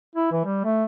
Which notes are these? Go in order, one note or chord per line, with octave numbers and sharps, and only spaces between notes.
E4
E3
G3
A3